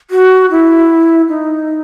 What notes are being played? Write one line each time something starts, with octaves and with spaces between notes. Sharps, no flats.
F#4
E4
D#4